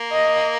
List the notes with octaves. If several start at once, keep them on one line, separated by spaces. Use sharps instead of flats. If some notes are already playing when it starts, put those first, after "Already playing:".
Already playing: A#3
D#5